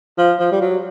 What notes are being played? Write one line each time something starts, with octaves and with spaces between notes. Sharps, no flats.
F3
F3
G3
F#3